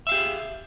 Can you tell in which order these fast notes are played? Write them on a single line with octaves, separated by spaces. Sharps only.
E5 F5 G4 G#4